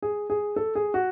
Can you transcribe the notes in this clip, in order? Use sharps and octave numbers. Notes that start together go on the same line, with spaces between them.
G#4
G#4
A4
G#4
F#4